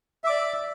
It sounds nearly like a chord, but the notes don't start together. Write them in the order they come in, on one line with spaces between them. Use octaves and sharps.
E5 D6 D5